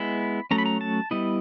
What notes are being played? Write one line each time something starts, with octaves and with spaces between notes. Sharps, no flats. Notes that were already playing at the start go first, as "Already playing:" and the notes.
Already playing: G#3 B3 E4 B5
F#3 A3 C#4 A#5
B5
A#5
A5
G3 B3 E4 D#5